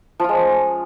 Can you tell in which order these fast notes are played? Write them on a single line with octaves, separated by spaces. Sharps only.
F3 F4 G#3 C#4